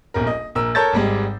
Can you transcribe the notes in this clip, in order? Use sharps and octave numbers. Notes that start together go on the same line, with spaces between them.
D#1 A#1 B2 A#4
D#5
A#1 A#4 E6
A4 A#4 C#5 A5 G6 A6
G#1 G3 G#3